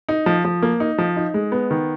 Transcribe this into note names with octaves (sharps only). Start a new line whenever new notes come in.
D#4
F3
F3
A#3
D#4
F3
D#4
G#3
B3
D#3